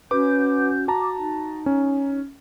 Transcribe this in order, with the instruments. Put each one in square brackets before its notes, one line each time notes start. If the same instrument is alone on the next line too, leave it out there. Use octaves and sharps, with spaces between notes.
[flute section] C#4 F#4 G6 [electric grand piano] B4 D6
[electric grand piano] F#4 A5 A#5 [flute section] D6
[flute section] D#4
[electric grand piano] C#4